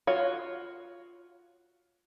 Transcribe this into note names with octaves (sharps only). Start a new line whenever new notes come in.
F4 F#4 C#5